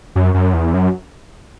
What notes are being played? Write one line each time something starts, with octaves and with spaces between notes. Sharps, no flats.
F#2
F#2
E2
F#2